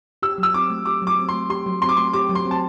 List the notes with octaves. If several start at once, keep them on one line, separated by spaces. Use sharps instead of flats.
G4 E6
F#3
E6
C4 D6
A3
G4 D6
F#3
D6
C4
A3 C6
G4 C6
F#3
C4 C6
D6
A3 C6
G4 D6
F#3
C6
C4
A5